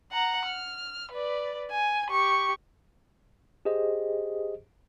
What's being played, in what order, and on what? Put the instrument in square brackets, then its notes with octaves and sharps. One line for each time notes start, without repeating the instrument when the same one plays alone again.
[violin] F#5 A#5
F6
B4 D5
G#5
G4 C#6
[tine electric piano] G4 G#4 C5 D#5